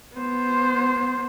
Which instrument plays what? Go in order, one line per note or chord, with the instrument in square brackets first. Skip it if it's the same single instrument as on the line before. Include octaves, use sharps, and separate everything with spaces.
[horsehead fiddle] B3 C5